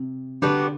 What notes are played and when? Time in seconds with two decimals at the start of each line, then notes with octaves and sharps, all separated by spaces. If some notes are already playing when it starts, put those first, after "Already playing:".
Already playing: C3
0.42 D3 G3 B3 D4 F#4